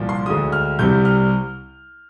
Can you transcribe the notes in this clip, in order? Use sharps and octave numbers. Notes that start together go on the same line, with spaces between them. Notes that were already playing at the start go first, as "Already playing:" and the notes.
Already playing: C2 A#2 F3
C6
D2 D3 G#3 D#6
F6
C2 C3 G3 G6
F6